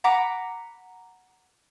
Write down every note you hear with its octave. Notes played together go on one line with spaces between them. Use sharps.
F#5 A#5 B5 D6